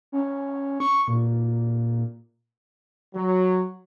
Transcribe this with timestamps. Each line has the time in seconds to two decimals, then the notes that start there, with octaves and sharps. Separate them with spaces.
0.12 C#4
0.80 C#6
1.08 A#2
3.14 F#3